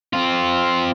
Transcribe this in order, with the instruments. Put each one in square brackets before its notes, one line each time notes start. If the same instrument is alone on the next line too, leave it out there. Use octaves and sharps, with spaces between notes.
[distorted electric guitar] C4 F4